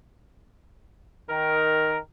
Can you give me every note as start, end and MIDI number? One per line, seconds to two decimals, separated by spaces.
1.30 1.97 51
1.30 1.97 70